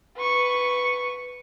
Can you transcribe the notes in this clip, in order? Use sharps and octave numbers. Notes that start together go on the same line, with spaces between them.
B4 C#6